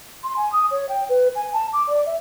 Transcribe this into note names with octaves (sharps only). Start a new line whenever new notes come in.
C6
G#5
D#6
C#5
G5
B4
G#5
A5
D6
D5
E5